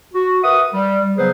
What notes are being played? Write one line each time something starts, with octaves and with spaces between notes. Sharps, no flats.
F#4
A#4 B4 E5 F#5 D#6
G3
C#3 F#3 B3 G#4 B4 C5